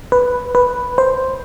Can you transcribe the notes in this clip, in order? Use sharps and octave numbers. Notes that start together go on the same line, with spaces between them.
B4
B4
C5